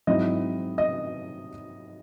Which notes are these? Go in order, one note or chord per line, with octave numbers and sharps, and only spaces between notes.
G#2 F#3 C4 E4 D#5
D#5